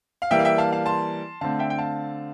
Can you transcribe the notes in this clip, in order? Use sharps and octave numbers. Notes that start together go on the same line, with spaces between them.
F5
E3 G3 A#3 E5 G5
F5
E5 G5
F5 A5
F5 A5
A5 C6
D3 A3 C4 F5 A5
E5 G5
G5
F5 A5